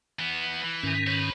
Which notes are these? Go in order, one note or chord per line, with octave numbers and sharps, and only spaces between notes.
E3 B3
E3
G#2 D#3 C#4
B4 C#5